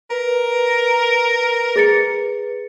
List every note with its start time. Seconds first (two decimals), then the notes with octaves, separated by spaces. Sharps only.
0.10 A#4 B4
1.76 G#4 A6 C#7